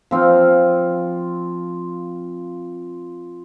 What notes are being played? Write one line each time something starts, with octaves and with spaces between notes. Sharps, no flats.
F3 C4 F4